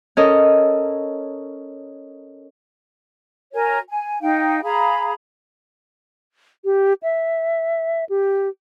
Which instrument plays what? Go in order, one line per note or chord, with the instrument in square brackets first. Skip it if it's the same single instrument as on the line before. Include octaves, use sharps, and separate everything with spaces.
[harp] C#4 A4 A#4 D#5
[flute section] F#4 A#4 C#5 G#5
G#5
D#4 F5 G5
G#4 F5 A#5 B5
[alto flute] G4
E5
G4